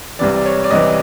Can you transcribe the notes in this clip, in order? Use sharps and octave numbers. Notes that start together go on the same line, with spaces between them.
C2 C3 E3 D5
D5
C#5
D5
C2 C3 E3 D#5